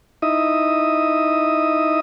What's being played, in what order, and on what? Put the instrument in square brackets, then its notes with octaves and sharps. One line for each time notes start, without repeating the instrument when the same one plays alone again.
[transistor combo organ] D#4 E4 D#5 E5 D#6